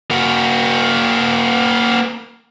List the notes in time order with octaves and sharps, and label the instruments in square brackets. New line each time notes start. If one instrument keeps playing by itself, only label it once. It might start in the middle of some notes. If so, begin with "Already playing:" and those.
[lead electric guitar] A#3 F#4